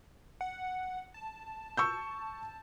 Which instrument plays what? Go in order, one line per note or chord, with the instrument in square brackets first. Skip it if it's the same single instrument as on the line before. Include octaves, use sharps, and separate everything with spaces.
[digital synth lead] F#5
A5
[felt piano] C#6 E6 G6